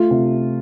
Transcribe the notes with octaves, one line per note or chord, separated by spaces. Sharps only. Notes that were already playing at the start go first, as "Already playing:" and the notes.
Already playing: A3 F4
C3